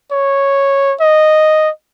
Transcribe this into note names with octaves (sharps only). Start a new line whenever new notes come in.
C#5
D#5